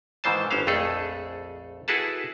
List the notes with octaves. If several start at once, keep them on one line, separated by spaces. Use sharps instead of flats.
G#2 D#3 E3 C5 A5
G1 C#4 C5 F5
A#1 F2 A3 G#4 A4
E4 F#4 G#4 A4 B4 A5